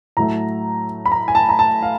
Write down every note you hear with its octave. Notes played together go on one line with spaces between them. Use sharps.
A2 F#3 A3 A#5
B5
A#5
G#5
A5
A#5
A5
F5